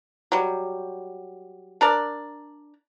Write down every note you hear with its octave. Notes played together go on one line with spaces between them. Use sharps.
F#3 G3
D4 A#4 D5